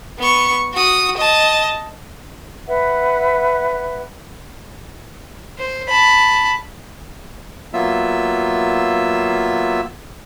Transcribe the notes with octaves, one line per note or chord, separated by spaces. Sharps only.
B3 C#6
F#4 D#6
D#5 A5
B4 E5 F#5
C5
A5 B5
F#3 A#3 B3 F4 E5 E6